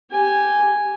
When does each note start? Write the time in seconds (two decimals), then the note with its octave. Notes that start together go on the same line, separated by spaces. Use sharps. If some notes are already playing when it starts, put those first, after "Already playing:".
0.11 G4 G#5